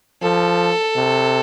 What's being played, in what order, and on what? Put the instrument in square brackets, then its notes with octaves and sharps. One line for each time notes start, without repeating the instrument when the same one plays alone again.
[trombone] F3 [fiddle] A4
[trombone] C3